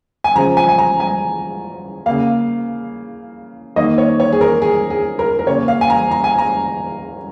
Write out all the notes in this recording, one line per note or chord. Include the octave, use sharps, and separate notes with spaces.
G#5
C#3 F3 G#3 A#5
G#5
G#5
A#5
G#5
C#3 A#3 F5
D#3 A#3 D#5
C#5
C#5
G#4
A#4
G#4
G#4
A#4
A#4
C#3 A#3 C#5
F5
G#5
A#5
A#5
G#5
A#5